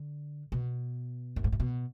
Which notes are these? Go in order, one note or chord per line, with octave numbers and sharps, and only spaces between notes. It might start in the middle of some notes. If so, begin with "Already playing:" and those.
Already playing: D3
B2
F#2
G#2
A2
B2